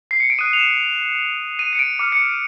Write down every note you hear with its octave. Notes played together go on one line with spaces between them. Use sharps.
C7
C#7
D7
D#6 F#6 D#7
F7
E7
D#7
C#7
D7
D6 F6 C#7
C#7
D#7